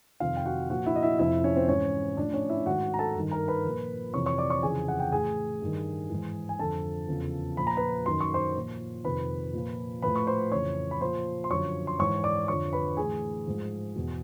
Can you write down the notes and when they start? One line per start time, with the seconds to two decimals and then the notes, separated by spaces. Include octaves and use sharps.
0.20 F2 C3 D#3 F4 F5
0.37 G5
0.46 F#4 F#5
0.70 A#2 F3 F#4 F#5
0.86 E4 E5
0.96 D#5
1.03 E4 E5
1.19 F2 C3 F3 E4 E5
1.44 C#4 C#5
1.56 C4 C5
1.68 G#2 E3 C#4 C#5
2.17 A2 F3 D4 D5
2.34 C#4 C#5
2.49 E4 E5
2.66 G#2 D#3 F#4 F#5
2.94 A#5
2.99 A4 A5
3.16 G2 D#3
3.31 A#4 A#5
3.48 B4 B5
3.65 A#2 F3
4.13 F2 C3 E3 C#5 C#6
4.26 C#5 C#6
4.38 D5 D6
4.50 C#5 C#6
4.62 F2 C#3 E3 G#4 G#5
4.88 F#5
5.00 G5
5.12 A2 E3 G#4 G#5
5.62 G2 D#3
6.10 G#2 E3
6.49 G#5
6.59 F2 D3 F3 A4 A5
7.08 E2 C#3 F3
7.57 A#2 F3 B5
7.67 A#5
7.77 B4 B5
8.06 F#2 D#3 C6
8.21 C#6
8.34 C5 C6
8.55 A#2 F3
9.05 F2 C3 D#3 B4 B5
9.53 A#2 F3
10.02 A2 F3 B4 B5
10.16 C#6
10.27 C5 C6
10.51 F2 C#3 E3 C#5 C#6
10.91 B5
11.00 A#2 F3 C5 C6
11.44 C6
11.50 F#2 D3 F3 C#5 C#6
11.87 C6
11.99 G#2 E3 C#5 C#6
12.24 D5 D6
12.48 F2 D3 F3 C#5 C#6
12.73 B4 B5
12.97 A2 E3 G#4 G#5
13.46 G#2 F3
13.96 E2 B2